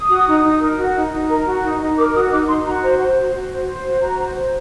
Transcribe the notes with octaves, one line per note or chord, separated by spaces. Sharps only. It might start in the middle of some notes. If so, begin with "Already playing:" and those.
Already playing: D#6
F#4
D#4
D#4
A#4
F#4
D#4
D#4
A#4
F#4
D#4
D#4
A#4 D6
F#4 D#6
D#4 D6
D#4 C6
F#4 A#5
C5 A#5
C5 C6
F#4
F#4
C5
C5
F#4
F#4 A#5
C5
C5